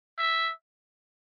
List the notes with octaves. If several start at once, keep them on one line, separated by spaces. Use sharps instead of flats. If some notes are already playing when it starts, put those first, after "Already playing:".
E5